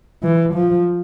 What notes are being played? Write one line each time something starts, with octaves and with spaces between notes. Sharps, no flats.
E3
F3